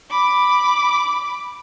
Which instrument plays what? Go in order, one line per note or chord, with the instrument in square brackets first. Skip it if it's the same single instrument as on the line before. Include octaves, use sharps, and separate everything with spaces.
[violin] B5 D6